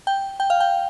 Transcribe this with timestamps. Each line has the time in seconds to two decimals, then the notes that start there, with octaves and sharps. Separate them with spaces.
0.07 G5
0.40 G5
0.50 F5
0.60 G5